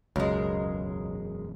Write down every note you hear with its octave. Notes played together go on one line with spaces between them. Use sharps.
E1 C#2 F#2 E3 F#3 G#3 A#4